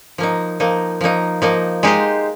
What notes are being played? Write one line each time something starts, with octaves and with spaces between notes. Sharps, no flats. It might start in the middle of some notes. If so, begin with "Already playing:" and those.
F3 A#3 D#4
F3 A#3 D#4
F3 A#3 D#4
F3 A#3 D#4
G#3 D#4 G4 C5